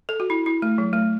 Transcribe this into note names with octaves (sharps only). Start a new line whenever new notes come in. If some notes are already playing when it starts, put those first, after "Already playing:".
A4
F#4
E4
E4
A3
F#3
A3